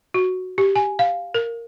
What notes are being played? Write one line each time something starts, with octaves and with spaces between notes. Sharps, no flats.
F#4
G4
G#5
F5
A#4